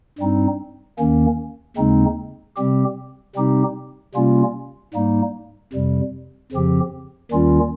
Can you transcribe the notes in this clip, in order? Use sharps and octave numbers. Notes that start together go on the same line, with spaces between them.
G2 G3 C4 D#4
D#2 D#3 A#3 C#4
D#2 C#3 G#3 C4 D#4
C3 G3 C4 G4
C3 G3 C4 D#4 G4
C3 G3 A#3 C#4 F4
G#2 G3 A#3 D#4
F2 C3 G3
F2 C#3 F3 C4 G4
D#2 D#3 G3 C#4 F4